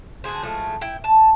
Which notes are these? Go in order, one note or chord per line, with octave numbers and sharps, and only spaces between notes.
D3 F#4 G#4 C5
A2 F3 G#3 A3
E4 G5
A5